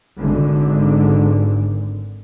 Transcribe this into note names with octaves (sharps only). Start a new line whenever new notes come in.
G#1 D3